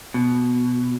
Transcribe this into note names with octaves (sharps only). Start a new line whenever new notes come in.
B2